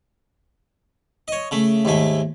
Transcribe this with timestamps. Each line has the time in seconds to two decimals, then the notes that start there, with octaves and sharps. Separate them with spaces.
1.28 C#5 D#5
1.51 C#3 A3
1.85 D#2 G#2 A3 G#5